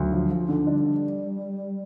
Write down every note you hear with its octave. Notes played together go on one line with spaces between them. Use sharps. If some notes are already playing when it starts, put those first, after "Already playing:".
Already playing: D2 F#3
F3
F3
D3
G3 D4